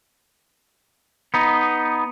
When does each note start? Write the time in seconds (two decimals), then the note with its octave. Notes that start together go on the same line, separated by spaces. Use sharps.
1.34 B3 D#4